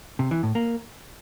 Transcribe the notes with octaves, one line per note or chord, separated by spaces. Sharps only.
C3
E3
A2
A#3